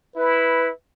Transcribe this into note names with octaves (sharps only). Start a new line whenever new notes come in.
E4 B4